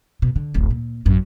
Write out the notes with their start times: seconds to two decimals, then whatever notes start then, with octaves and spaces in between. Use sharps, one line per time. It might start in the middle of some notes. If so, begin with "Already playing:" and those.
0.22 B2
0.36 D3
0.54 D1 A1
0.70 A#2
1.05 A1 F#2